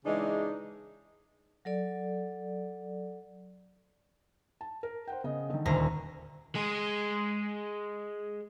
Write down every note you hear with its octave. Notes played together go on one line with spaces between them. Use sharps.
C#3 E3 G#3 D4 D#4
F#3 A4 D5
A5
A#4
C5 F#5 G5
C#3 D#5
D3 D#3
D#1 D2 A#5
G#3 G#4